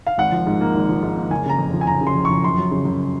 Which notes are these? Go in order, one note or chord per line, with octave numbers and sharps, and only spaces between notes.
F5
G#1 F#5
F3
G#2
A#3
G#1
F3
G#2
A#3
F#1 G#5
C#3 A#5
F2
F3
G#5
F#1 A#5
C#3
C6
F2
C#6
F3
F#2 C6
F#3
C#3
F#2